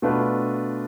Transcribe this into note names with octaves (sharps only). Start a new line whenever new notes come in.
B2 A3 D4 F4 B4